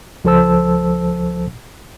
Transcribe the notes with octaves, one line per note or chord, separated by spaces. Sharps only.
C#2 F3 A4 C5 A5 E6